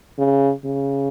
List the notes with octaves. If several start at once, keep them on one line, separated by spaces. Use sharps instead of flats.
C#3
C#3